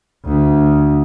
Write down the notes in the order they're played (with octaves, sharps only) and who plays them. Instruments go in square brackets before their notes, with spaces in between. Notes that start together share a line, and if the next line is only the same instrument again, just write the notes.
[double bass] D2